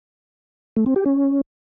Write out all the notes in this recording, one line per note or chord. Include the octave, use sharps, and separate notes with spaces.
A3
C4
G4
C#4